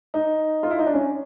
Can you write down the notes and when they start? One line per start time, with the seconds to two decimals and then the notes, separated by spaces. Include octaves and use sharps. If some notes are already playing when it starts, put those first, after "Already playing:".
0.14 D#4
0.63 F4
0.70 E4
0.79 D#4
0.86 D4
0.94 C#4